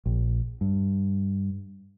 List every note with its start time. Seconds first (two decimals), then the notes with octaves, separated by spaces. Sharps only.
0.06 A#1
0.61 G2